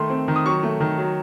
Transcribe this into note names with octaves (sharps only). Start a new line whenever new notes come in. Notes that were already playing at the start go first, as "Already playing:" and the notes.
Already playing: D#3 A3 C6
C4
D#3
D#6
F#3 C#6
A3
D#3
F#3